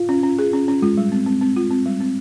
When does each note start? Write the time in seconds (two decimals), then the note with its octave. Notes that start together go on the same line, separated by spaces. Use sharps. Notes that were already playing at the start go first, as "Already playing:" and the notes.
Already playing: F4
0.09 C#4
0.23 C#4
0.39 G#4
0.53 C#4
0.68 C#4
0.82 G#3 F4
0.98 G3
1.12 C4
1.26 C4
1.41 C4
1.56 F4
1.70 C4
1.86 G3
2.00 C4